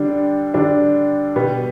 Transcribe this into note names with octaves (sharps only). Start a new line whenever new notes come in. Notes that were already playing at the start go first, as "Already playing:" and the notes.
Already playing: D3 G3 D4
D3 G3 D4
B2 G3 B3